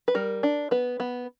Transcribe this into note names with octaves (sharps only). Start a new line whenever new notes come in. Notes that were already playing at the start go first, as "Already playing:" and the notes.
B4
G3 A#4
D4
B3 B4
B3